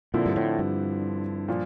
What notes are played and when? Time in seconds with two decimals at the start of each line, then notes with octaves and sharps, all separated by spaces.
0.14 A#2 D3 F3 C4 E4
0.26 G2
0.36 A2
0.59 G2
1.48 A#2 F3